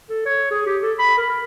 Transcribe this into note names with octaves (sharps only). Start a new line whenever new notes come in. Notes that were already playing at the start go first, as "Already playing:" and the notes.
A4
C#5
G#4
G4
A4
B5
A#4
A#4